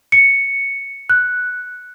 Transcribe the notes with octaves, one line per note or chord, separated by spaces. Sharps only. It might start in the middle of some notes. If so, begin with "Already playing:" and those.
C#7
F#6